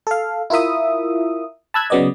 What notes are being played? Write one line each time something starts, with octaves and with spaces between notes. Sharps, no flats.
A4 F5
E4 F4 A#4 E5 D#6
A5 B5 E6 F#6 G#6
C#3 F#3 B3 D5 D#5